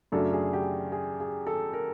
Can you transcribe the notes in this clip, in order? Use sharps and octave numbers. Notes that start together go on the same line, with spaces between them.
F#2 C#3 F#3 A3 D4 A4
G#4
G4
G#4
G#4
A4
A#4